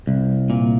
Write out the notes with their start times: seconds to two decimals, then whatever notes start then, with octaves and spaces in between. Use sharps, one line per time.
0.07 C2
0.50 A#2